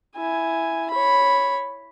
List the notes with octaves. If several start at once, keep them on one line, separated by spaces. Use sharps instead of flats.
E4 G#5
C#5 B5